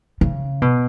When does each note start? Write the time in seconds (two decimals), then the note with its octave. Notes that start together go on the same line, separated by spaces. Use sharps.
0.21 C#3
0.62 B2